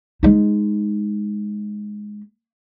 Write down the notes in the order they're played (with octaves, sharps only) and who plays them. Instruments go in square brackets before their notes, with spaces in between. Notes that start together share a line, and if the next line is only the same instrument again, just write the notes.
[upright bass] G#3 D#4